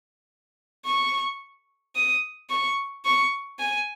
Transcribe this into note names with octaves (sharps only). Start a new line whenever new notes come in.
C#6
D#6
C#6
C#6
G#5